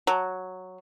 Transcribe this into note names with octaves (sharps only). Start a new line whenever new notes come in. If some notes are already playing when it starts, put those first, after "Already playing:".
F#3